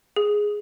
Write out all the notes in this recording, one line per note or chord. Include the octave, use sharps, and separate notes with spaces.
G#4